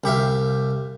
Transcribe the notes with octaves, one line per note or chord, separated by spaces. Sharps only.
C2 G4 E5 F5